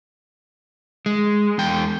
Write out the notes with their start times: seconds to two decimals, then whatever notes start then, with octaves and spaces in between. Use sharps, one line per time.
1.06 G#3
1.58 E2 G5